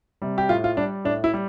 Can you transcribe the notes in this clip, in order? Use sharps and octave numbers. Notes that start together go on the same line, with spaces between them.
C3 G3
G4
A2 F4
F4
G3 D4
A2 D4
E4
G3